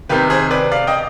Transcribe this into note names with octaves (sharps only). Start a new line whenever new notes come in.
C3 D#3 G4 B4
G#4 C5
B4 D5
D5 F5
D#5 G5